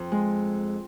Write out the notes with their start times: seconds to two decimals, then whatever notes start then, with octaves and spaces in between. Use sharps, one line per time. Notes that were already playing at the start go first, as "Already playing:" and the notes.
Already playing: F2
0.12 G#3